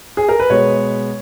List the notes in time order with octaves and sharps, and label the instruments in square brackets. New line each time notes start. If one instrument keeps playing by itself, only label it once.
[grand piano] G#4
A#4
B4
B2 G#3 B3 C#5